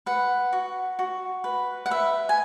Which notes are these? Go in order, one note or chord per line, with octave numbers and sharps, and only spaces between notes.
B4 F#5
F#4
F#4
B4
F#5
B4 E5
G#5